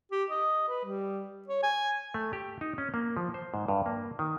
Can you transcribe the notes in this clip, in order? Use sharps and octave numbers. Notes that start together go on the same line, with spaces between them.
G4
D#5
B4
G3
C#5
G#5
A3
G4
D#4
C#4
A#3
F3
C5
G#2
G2
A#3
D#3